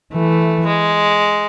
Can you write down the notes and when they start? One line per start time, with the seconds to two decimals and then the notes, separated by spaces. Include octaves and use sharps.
0.13 E3 A3
0.67 G#3